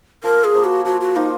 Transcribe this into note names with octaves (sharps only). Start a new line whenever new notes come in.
F3 A#4
G#4
A#3 F4 C5
F#4
F3 F#4
F#4
A#3 D#4 F4 C5